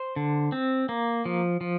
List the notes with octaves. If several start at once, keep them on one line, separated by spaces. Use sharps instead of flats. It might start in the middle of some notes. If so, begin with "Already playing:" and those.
Already playing: C5
D3
C4
A#3
F3
F3